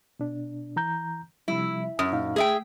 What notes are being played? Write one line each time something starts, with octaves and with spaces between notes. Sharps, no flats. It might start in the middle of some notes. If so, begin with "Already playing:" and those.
B2 D4
E3 A#5 G6
C3 F3 G3 E4
F#2 D#6
A#2 D#4 F5
A3 G#4 E5 G5